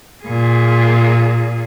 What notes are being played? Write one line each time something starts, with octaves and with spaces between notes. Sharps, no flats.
A#2 G#4